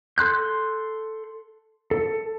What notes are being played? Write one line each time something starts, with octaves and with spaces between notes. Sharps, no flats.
A4 C6 F#6 G6
A4